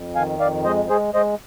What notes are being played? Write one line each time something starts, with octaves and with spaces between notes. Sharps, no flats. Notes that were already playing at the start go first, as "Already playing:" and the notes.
Already playing: F2
D#3 F5 G#5
F2 D5 F5
G#3 C5 D#5
G#3 G#4 C5
G#3 C5 D#5